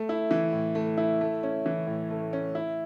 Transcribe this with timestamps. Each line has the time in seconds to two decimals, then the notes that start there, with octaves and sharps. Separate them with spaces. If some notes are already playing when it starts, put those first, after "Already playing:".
Already playing: A3
0.09 E4
0.31 E3
0.53 A2
0.75 A3
0.97 E4
1.21 A3
1.43 C#4
1.66 E3
1.87 A2
2.10 A3
2.33 C#4
2.55 E4